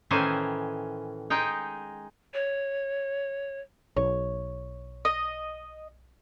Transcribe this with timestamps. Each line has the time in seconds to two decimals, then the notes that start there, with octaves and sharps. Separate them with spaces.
0.11 A2 D#3 E3 C#4 C5 G#5
1.30 G#3 D#4 G5
2.34 C#5
3.96 B1 C#5
5.05 D#5